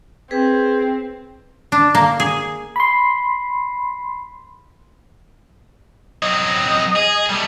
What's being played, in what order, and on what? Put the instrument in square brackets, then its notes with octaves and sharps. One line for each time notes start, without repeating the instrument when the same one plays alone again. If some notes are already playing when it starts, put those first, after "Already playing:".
[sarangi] C4 [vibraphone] G#4 B4
[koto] D4
A#3
G#4
[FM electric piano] B5 C6
[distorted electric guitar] F#3 C4 [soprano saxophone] D#5
[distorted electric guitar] G#4
G3 A3